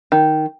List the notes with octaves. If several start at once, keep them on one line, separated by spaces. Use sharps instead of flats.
D#3